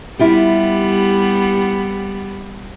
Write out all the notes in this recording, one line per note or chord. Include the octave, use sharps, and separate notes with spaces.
G3 B3 E4 F4 G4